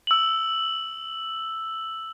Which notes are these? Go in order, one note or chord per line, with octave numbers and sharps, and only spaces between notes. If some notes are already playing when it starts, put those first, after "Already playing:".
E6 F#7